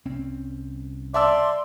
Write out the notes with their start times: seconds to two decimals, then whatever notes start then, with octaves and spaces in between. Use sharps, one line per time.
0.05 C2 C4 C#4
1.14 D5 E5 A5 C6 E6